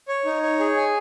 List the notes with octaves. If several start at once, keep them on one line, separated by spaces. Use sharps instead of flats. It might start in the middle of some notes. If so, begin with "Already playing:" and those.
C#5
D#4
C#5
G#4
G#5